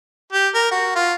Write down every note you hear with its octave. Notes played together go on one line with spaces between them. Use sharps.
G4
A#4
F#4
F4